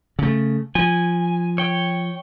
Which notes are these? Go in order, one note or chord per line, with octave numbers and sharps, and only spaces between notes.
C#3 A3
F3 G#5
C#5 G5